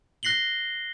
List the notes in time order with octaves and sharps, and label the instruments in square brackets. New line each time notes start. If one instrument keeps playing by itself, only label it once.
[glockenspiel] F#6 A#6 C7 F#7 G7